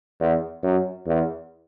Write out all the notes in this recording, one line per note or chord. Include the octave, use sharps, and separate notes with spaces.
E2
F#2
E2